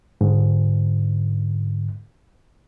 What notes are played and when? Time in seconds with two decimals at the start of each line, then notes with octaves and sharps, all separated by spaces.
0.21 G#2 D3